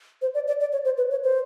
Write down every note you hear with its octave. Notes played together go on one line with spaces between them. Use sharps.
C5
D5
D5
D5
C#5
C5
B4
C#5
C5